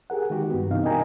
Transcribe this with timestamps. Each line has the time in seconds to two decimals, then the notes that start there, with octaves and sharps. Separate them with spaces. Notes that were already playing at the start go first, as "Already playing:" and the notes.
0.10 G4 G#4 A#4 F#5
0.30 D#3 G#3 F#4 G4
0.50 G2 B3
0.71 C3 E3 D#4 F5
0.84 D4 A#4 D#5 G5 G#5 A#5